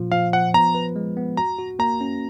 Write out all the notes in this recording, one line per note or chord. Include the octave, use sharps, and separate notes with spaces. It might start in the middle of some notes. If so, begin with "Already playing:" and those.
Already playing: A#2 F3 F4
F3 F5
F3 F#5
B3 A#5
B4
G#3
B3
F#4 A#5
F#4
A#3 A#5
C#4